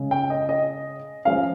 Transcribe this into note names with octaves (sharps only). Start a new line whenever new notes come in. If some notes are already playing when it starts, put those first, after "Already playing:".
Already playing: C#3 G#3 C#4
G5
D#5
D#5
F3 G#3 C#4 F5